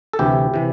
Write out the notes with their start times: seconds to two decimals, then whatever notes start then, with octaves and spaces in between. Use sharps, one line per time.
0.13 A4
0.19 D2 C3 E3 E4 G4
0.54 C3 E3